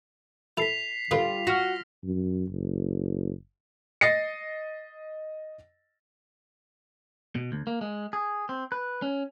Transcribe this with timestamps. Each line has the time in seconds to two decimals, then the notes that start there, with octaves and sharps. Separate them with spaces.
0.57 E4 A4 B6 C7 F7
1.11 D3 G3 F4 B4 D#6
1.47 F#4 C#6 F6 A#6
2.04 F#2
2.50 F#1
4.01 D#5 A6 A#6 C7 C#7
7.35 B2
7.52 D2
7.67 A#3
7.81 G#3
8.13 G#4
8.49 C4
8.72 B4
9.02 C#4